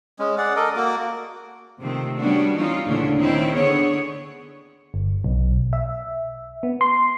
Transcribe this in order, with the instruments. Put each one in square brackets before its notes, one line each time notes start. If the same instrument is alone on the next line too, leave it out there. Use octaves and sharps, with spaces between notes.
[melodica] G#3 C#4
G#4 D5 F#5
A4 A#4 D#5 D6
A#3 F#4 D6
[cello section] C3 D#3 F3 A3 C4
G3 B3 C#4 D4 F#4
E3 G3 C#4 D#4 F4
D2 A#2 C#3 E3 C#4 D4
D#3 C4 C#4 D#4 E4
D3 B3 G#4 C#5
[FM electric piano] G1
B1
E5
B3
C6